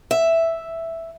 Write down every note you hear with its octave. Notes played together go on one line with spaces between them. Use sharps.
E5